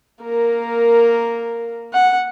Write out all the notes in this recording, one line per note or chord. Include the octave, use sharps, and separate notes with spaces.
A#3 A#4
F#5